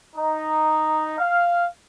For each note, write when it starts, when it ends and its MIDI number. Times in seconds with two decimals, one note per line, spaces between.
0.16 1.15 63
1.18 1.65 77